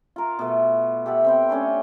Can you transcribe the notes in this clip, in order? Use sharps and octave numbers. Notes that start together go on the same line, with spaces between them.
F4 A#4
B2 A3
G4 A4 E5 F#5
C4 B4 G5
A3 C#4 D4 C6